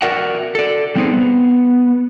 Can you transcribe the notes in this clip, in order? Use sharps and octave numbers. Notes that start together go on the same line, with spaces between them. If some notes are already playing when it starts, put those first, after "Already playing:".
F#4 A#4 D5 E5 F#5
A4 D5
G3 B3 C4 D#4 G#4 C5
B3